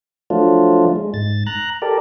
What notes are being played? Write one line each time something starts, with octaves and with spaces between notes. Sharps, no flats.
F3 F#3 A3 D4 F4
G#3
G#2 A6
A#5 F#6
G4 A4 A#4 D5